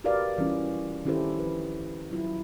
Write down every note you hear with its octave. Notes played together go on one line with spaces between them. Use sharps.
F#4 G4 A#4 B4 D5 F5
E3 G3 C#4 F4
D#3 C#4 E4 G4 A4 C5
F3 B4
F#3 E4 F4